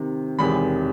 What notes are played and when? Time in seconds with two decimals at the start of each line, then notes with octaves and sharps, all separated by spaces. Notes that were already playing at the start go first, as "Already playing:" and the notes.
Already playing: C3 D#3
0.39 E1 E2 C3 D#3 G#3 B5